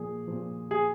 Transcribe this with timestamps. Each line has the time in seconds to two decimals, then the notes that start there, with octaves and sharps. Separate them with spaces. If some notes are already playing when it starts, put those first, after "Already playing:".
Already playing: A#2 F3 G#4
0.27 A#2 F3
0.71 G#4